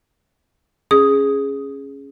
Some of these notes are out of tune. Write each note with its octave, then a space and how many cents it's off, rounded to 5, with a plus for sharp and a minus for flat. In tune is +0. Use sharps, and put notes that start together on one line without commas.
C#4 -5 G#4 +0 D#6 +5